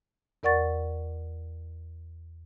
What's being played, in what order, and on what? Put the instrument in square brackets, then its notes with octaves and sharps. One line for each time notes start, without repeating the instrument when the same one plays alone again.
[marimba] E2 A#4 D5 F#5 C#6 A6